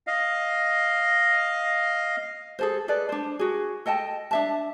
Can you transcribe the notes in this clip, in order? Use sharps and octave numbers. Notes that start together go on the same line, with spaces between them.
D#5 F5
G#4 A4 C5
G#4 A4 B4 D5
D4 C5
F#4 G#4
A4 D#5 G5 A5
D4 E5 A5